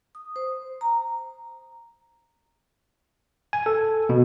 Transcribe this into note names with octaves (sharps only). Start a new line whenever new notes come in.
D#6
C5
A#5
G#5
A4
B2